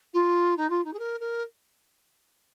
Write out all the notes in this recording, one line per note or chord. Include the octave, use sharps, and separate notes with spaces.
F4
D#4
F4
D#4
G#4
A#4
A#4